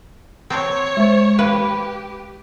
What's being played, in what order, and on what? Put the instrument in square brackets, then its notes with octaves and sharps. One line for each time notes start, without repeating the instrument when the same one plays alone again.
[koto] C4 [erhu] C#5
[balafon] G#3 C5
[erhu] G4 [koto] B4 [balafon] F5